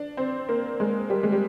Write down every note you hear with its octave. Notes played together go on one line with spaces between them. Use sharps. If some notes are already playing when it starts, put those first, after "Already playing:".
Already playing: D4
C4
A#3
G#3
G3
G#3
G3